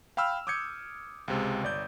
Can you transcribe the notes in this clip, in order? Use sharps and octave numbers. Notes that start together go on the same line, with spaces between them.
F5 G5 B5 E6 F6
D6 D#6 G6 G#6 C#7
C#2 C3 G#3
G1 D5 G6